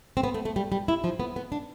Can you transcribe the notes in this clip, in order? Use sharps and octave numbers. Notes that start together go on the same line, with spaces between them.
C4
B3
A3
A3
G3
G3
E4
F3
B3
B3
D4